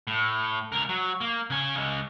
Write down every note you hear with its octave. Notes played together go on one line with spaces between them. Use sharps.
A2
C#2 A#4
F#3
A#3
C#3 G#5
C#3 G#3